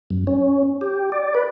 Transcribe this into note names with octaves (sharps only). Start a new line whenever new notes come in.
F#2
C#4
G4
D5
B4